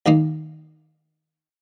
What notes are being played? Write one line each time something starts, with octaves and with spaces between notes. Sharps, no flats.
D#2 D#3 A#3 D#4